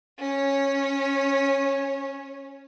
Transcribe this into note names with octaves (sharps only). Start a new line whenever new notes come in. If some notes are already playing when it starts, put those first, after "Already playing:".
C#4 C#5